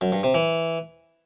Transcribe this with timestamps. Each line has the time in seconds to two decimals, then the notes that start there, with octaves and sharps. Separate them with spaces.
0.01 F#2
0.12 G2
0.23 C3
0.34 E3